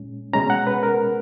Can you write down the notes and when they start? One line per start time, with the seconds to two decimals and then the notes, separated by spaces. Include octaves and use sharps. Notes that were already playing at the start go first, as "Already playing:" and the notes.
Already playing: A#2 G#3 C#4
0.33 B2 G#3 C#4 A#5
0.50 F#5
0.67 B4
0.83 A#4